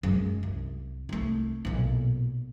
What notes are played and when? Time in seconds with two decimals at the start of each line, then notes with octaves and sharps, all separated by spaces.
0.03 F#2 G#3
0.43 C2
1.09 C2 A3
1.65 B1 A#2